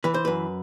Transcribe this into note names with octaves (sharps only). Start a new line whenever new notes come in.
E3 B4
C5
F#2 B4